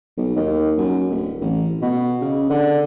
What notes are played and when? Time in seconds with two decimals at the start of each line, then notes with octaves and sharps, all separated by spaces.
0.17 B1
0.36 D#2
0.78 F#2
1.10 D1
1.41 A1
1.82 B2
2.22 C#3
2.50 D3